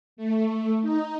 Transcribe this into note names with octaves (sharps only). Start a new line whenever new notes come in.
A3
D#4